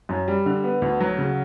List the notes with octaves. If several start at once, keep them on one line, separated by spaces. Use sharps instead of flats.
F#2
G3
D3
B3
D2
F#3
C#3